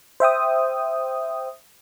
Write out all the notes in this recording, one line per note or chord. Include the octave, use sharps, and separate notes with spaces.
C5 E5 G5 D#6